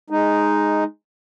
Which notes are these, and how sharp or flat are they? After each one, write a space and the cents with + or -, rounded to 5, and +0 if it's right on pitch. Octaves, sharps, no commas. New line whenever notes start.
G#3 +0 D#4 +0